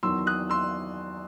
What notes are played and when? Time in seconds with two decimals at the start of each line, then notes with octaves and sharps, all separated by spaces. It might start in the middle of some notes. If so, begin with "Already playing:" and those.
0.03 E2 D#3 F#3 C6 E6
0.26 D#6 F#6
0.49 C6 E6